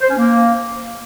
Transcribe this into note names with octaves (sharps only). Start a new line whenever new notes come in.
C5
C#4
A#3